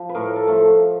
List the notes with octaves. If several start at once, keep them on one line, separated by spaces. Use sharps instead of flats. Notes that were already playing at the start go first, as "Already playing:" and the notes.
Already playing: F3
B4
A2 A#4
A4
F3 A3